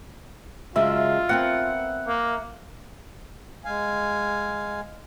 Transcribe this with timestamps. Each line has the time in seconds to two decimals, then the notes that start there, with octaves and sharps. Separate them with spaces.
0.76 F#2 C#3 G#3 F4 E5
1.29 B3 C4 A#4 F#5
2.07 A#3
3.65 G#3 F5 G#5